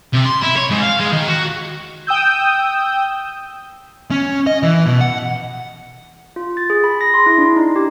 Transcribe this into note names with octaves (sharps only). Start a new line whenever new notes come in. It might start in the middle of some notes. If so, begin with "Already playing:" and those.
C3
C6
E4
C#5
G#2
F5
G#3
D#3
F#4
G5 D#6 E6 G6
C#4
D#5
E3
B2
F#5
F4
A6
G#4
B5
A#6
C6
E4
D4
D#4
G4